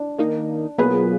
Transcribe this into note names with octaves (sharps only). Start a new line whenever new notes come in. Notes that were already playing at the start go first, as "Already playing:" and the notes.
Already playing: D4
D#3 A#3 D#4
B2 F#3 A#3 B3 F4 G#4 B4